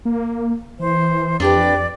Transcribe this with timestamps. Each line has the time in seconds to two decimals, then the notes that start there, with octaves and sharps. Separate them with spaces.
0.05 A#3
0.79 E3 C5
1.40 F2 D4 G4 B4 D5